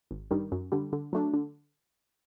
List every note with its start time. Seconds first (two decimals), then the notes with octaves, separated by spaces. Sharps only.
0.11 G#1
0.31 G2 D#3 G3
0.52 F#2
0.72 D3 G3
0.93 D3
1.13 F#3 A3 D4
1.33 D3